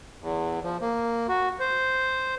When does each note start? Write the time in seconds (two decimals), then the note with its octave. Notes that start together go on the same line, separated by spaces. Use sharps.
0.21 E2
0.63 F3
0.82 A#3
1.29 F#4
1.60 C5